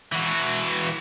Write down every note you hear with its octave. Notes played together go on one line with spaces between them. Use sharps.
E3 F#4